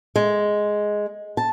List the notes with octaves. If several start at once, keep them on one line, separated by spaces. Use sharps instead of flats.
G#3
A5